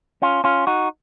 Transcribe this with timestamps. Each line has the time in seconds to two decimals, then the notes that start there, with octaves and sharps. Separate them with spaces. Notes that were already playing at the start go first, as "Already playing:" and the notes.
0.22 C#4 F4
0.44 C#4 F4
0.67 D#4 F#4